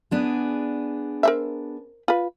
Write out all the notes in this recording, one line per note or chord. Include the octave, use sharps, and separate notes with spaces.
B3 D4 G#4
A#4 C5 E5
F4 B4